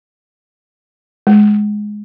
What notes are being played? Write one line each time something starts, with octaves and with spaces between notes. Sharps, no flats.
G#3